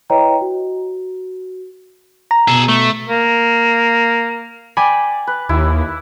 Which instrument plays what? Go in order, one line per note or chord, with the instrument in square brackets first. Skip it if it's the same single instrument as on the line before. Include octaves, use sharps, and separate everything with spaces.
[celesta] E4 B4 C#5 D#5 G5 A#5
F#4
[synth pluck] A#5
[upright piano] B2 [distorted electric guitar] G#4 A4
[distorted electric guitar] A3
[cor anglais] A#3
[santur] D5 [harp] G5 G#5 B5
[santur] B4
[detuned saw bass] D#2 [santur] E4